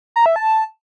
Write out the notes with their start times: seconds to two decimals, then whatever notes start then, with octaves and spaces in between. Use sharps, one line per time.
0.16 A#5
0.26 E5
0.36 A5